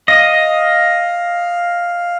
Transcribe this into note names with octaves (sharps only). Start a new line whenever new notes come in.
D#5 F5